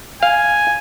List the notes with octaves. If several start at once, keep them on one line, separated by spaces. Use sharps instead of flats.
F5 G#5